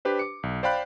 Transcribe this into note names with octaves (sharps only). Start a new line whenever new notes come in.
D4 G4 B4 C5
D6 C#7
B1
C5 D5 F5 G5 B5 F#6